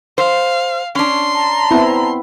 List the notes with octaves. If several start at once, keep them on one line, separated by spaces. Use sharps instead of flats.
C5 F5
C#4 D4 C6
A5 A#5
B3 C4 E4